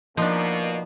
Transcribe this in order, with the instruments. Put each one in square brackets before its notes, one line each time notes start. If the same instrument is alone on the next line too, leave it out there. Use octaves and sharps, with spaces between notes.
[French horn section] B2 [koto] F3 [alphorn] A#3 [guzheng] D4 D#4